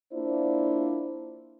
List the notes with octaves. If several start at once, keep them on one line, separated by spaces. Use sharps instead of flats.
A#3 D4 E4 F4 C5 D5